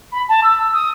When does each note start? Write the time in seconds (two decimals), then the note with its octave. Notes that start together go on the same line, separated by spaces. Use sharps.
0.12 B5
0.28 A5
0.43 E6
0.73 D#6